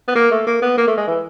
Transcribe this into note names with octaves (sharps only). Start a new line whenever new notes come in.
B3
A#3
A3
A#3
B3
A#3
A3
G#3
E3